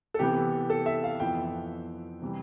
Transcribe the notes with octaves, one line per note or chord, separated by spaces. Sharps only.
A4
C3 E3 B3 G4
A4
E5
F5
F2 E3 B3 G5
C3 E3 G3